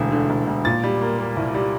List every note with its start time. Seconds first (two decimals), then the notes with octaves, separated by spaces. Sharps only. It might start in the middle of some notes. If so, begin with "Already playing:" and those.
Already playing: E1 D2 D3
0.12 D3
0.30 E1
0.47 E1
0.65 A#2 A6
0.84 G3
1.01 A#3
1.19 A#3
1.37 C2
1.54 G3